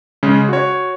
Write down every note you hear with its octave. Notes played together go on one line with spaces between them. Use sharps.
C#3 G#3 C#4
F#4 C#5